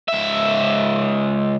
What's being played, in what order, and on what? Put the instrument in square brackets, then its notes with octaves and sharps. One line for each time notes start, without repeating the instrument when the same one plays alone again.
[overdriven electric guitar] C#2 E5